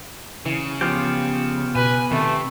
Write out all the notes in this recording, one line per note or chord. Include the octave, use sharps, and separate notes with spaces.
C#3 E3
F3 B3 F4 G4
B2 B4 G#5
C3 D#3 A3